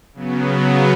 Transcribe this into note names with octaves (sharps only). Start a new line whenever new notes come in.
C#3 F#3 B3